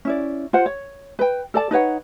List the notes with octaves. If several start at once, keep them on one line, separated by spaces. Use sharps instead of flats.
C#4 E4 D5
F4 C5 F#5
C#5
B4 G5
A4 D5 A5
D#4 B4 C#5 F#5